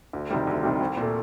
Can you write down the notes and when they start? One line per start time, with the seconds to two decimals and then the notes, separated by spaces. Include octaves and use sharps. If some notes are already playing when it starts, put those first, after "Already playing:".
0.13 D2
0.31 C3 D#3 G3
0.47 D2
0.63 C3 D#3 G3
0.80 C2
0.97 A#2 A3